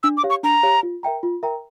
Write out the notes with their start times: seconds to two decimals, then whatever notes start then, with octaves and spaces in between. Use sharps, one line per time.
0.03 D4 E6
0.17 D6
0.23 G4 C#5 F5
0.30 C#6
0.43 D4 A#5
0.63 G4 C#5 F5
0.83 F4
1.03 A#4 E5 G5 A#5
1.23 F4
1.43 A#4 E5 G5 A#5